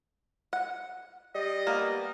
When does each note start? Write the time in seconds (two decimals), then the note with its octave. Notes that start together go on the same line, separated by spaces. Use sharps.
0.53 F#5
1.35 G3 D#5
1.67 A#3 B3